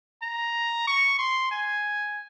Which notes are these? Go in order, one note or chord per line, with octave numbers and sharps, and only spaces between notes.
A#5
C#6
C6
G#5